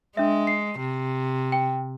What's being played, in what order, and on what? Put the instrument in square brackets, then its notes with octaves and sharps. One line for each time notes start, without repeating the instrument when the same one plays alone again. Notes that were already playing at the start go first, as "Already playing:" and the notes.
[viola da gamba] G#3 [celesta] D4 E5
[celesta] C7
[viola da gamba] C3
[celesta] G5